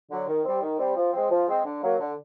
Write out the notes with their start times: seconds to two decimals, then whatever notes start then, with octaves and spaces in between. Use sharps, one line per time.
0.10 D3 F#3
0.28 D#3
0.45 G3 C4
0.62 D#3
0.79 G3 C4
0.97 F3
1.13 G#3 C4
1.31 F3
1.48 G#3 C4
1.65 D3
1.82 F#3 A#3
1.99 D3